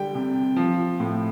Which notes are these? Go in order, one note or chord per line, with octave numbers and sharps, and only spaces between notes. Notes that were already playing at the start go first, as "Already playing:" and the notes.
Already playing: D3 G3 G5
C3
F3
A2